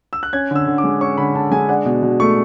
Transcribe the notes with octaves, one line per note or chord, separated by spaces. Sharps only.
E6
F#6
C#4 G#6
D3 E6
D3
D6
G#3
C#4 C#6
D3 B5
D3 A5
G#3 G#5
D4 F#5
B2
B2
A3 C#6